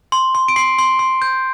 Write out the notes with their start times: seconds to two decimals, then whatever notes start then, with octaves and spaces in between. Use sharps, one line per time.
0.12 C6
0.35 C6
0.48 D7
0.56 C6 C7
0.79 C6
0.99 C6
1.22 G6